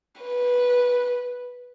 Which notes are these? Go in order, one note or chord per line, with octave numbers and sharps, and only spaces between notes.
B4